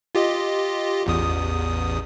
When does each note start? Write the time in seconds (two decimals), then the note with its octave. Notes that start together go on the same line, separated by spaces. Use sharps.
0.15 F4 G4 D#5
1.06 A1 E2 D#6